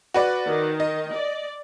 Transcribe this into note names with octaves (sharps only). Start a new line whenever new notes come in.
F#4 B4 D5
D#3
D#5
D5